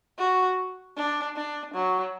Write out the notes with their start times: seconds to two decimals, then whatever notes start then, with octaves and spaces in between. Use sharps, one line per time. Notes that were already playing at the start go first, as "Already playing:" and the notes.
0.18 F#4
0.97 D4
1.36 D4
1.74 F#3